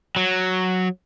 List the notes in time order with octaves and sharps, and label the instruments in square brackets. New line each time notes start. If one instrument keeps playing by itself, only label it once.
[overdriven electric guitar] F#3